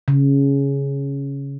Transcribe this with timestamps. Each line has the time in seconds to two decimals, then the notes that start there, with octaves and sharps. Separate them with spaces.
0.08 C#3